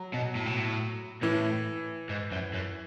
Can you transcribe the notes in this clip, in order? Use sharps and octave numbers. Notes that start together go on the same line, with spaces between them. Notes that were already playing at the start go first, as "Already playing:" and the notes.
Already playing: F#3
B2
A2
B2
A2
A2 E3
G#2
F#2
F#2